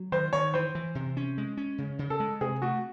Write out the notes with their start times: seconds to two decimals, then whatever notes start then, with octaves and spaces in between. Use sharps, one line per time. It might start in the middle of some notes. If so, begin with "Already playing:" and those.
Already playing: F#3
0.12 D#3 C5
0.33 D#3 C#5
0.54 E3 C5
0.75 E3
0.95 C3
1.17 C#4
1.38 G#3
1.57 C#4
1.78 C#3
1.99 C#3
2.10 A4
2.20 G#3
2.41 C3 G#4
2.62 A3 F#4